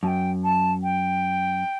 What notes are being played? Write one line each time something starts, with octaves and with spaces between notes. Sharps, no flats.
F#2 G5 A5
A5
G5